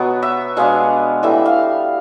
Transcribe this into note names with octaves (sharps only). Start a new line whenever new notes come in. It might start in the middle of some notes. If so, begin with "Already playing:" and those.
Already playing: B2 F#3 B3
E5
B2 G#3 B3 D4 F5
A2 E3 G3 E5
F5